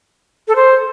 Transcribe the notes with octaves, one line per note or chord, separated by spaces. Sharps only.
A4
C5